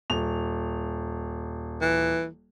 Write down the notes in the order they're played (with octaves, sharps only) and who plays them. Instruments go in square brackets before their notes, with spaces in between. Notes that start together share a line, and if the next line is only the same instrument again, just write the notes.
[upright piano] D#1 F7
[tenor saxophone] E3